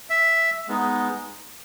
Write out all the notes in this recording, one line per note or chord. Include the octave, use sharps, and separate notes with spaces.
E5
G#3 B3 D#4